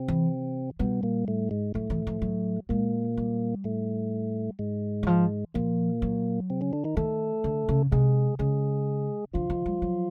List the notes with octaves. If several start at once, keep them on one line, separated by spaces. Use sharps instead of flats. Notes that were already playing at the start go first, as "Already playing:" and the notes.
Already playing: C3 C4
E3
B2 G3 B3
A#2 A#3
A2 A3
G#2 G#3
A2 F#3 A3
E3
F3
F#3
A#2 G#3 A#3
G3
A2 A3
G#2 G#3
E3
F3
A#2 F3 A#3
F#3
C3 C4
C#3 C#4
D3 D4
D#3 D#4
D#3 A3 A4
D3
C#3
C3 G#3 G#4
C#3 G#3 G#4
D3 F3 F4
D#3
G3
F#3